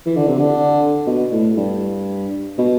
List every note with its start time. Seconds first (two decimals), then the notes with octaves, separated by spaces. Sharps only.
0.06 E3
0.16 D3
0.27 C3
0.38 D3
1.06 B2
1.32 A2
1.57 G2
2.58 B2